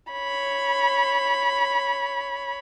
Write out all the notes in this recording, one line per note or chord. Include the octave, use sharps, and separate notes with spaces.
C#5 B5